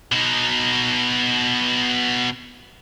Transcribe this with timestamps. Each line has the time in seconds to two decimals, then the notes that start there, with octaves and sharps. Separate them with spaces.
0.12 B2 D#4